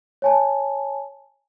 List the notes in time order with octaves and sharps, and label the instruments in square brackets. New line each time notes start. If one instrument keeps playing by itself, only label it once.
[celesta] C#5 G#5 A5